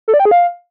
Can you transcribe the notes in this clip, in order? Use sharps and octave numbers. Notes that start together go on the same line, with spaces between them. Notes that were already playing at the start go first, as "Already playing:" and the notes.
A4
D5
G5
G#4
F5